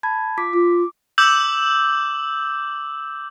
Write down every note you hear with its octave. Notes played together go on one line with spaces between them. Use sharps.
A5 B5 G#6
F4 D6 B6
F4 D6
D6 E6 G6 F#7